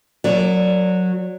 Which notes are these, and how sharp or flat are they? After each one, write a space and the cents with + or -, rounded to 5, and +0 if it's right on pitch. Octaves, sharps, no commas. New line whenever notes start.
F#3 -15 A#4 -20 D5 +0